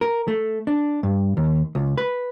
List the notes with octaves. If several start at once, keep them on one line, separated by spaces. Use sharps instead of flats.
A#4
A3
D4
G2
D#2
C#2
B4